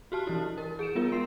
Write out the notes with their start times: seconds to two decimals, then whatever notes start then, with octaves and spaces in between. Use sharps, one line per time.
0.12 F#4 G4 A5 F6
0.27 E3 E4
0.58 A#4
0.79 G#4 D7 E7
0.95 G3 B3 F4 A#4
1.12 G#3 C6 C7